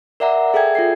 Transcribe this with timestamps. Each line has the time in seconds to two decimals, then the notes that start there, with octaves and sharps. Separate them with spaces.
0.20 A#4 D5 E5 F#5 A#5
0.54 G#4 A4 E5 G5 G#6
0.75 F4 A4 C7